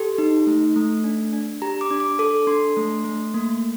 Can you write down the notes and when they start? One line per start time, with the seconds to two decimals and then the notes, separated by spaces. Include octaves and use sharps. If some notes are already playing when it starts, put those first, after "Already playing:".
Already playing: G4 A4 C6
0.18 D#4
0.47 A3
0.76 A3
1.04 D4
1.33 D4
1.62 G4 A#5
1.81 D6
1.91 D4
2.00 D6
2.19 A4 D6
2.47 D4 C6
2.77 A3
3.05 A3
3.34 A#3